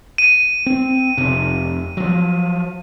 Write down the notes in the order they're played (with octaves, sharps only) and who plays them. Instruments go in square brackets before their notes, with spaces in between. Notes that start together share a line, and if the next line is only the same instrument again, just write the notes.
[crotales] D#7
[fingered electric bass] C4
F1 C3
F3 F#3